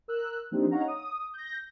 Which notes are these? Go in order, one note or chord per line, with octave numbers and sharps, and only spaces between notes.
A#4 E6 F#6
F3 A#3 C4 D4 D#4 G4
C#4 D#4 C#5 F5 F#5 A#5
D#6
G6 A#6